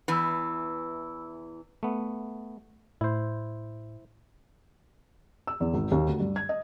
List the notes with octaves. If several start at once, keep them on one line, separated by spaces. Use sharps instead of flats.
E2 E3 B5 E6
A3 B3
A2 E4 C5
E6
E2
G#1
D#2
D2
G2
G#6
D#5